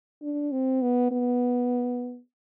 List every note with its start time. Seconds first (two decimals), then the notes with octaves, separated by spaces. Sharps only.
0.23 D4
0.52 C4
0.82 B3
1.11 B3